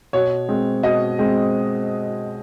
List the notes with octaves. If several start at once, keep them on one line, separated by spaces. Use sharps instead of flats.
B2 C#5
G#3 C4
B2 D#5
G#3 C4